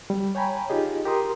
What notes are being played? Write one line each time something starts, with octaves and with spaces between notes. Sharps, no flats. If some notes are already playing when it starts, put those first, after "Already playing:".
G3
C#5 G5 G#5 A#5 B5
D#4 F4 G4 G#4 D#5
G4 A#4 A#5 C6 D#6